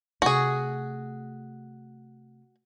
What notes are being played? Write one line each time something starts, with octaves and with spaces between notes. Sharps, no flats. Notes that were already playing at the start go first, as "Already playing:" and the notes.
C3 A3 F#4 G#4